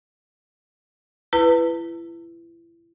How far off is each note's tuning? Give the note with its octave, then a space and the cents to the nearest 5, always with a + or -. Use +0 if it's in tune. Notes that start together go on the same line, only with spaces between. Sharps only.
E4 +30 B4 +0 A#5 -45